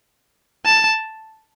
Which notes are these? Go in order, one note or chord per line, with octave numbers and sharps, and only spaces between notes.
A5